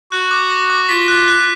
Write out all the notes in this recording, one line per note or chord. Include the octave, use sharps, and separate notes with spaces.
F#4 F#6
D6
A#6
D6
F4 B6
F#6
F#6